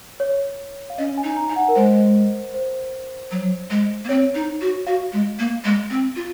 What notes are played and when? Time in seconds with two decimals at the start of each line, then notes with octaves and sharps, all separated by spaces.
0.20 C#5
0.90 F5
0.98 C#4 D#5
1.18 G#5
1.24 D#4
1.37 A#5
1.49 D#4 G#5
1.56 F#5
1.68 A#4
1.76 G#3 C5
2.54 C5
3.31 F#3
3.70 G#3
4.04 A#3
4.09 C4 C#5
4.35 D#4
4.61 F#4
4.87 F#4 F5
5.13 G#3
5.39 A#3
5.64 G#3
5.90 C4
6.16 F4